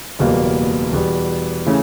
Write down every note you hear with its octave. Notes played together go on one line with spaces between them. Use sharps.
F#1 E2 B2 G3 A#3
E2 B2 G3
C#3 E3 A3 C#4